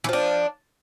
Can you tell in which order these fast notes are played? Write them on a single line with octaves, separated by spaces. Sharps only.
E3 F3 D4